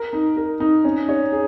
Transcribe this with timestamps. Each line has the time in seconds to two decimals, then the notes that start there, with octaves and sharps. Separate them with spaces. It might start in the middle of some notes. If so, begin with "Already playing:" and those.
Already playing: A#4
0.13 D#4
0.37 A#4
0.60 D#4
0.85 C#4
1.09 C#5
1.32 G#4